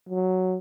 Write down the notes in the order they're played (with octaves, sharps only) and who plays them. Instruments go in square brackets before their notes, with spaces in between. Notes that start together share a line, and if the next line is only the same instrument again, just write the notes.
[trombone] F#3